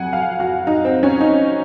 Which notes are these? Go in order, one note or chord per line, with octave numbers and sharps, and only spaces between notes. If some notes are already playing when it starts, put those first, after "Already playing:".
Already playing: F2 F#3 F#5 G#5
F5
F#4
D#4
C4
C#4
D#4